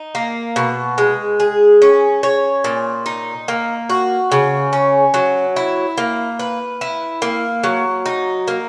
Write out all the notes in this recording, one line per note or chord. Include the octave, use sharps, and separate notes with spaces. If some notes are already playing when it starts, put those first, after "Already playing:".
Already playing: D#4
A#3
B2
G#3
G#4
C#4
C#5
A#2
D#4
A#3
F#4
C#3
C#4
F#3
E4
A#3
B4
E4
A#3
F#3
D#4
A#3